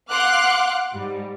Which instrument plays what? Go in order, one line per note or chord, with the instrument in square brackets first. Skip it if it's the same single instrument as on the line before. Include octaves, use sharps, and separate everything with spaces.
[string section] F5 F#5 C6 D6 F6 F#6
G#2 G3